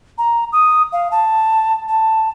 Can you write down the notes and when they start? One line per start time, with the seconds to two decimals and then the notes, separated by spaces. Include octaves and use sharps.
0.18 A#5
0.52 D#6
0.93 F5
1.11 A5
1.88 A5